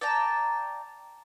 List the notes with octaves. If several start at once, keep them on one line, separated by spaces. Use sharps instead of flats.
D5 G5 A5 A#5